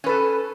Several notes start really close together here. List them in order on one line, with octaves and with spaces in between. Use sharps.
C#4 B4 A4